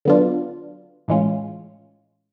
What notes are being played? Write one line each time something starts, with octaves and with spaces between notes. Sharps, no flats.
D3 F#3 B3 D4 F4
A2 E3 G#3 C#4 F4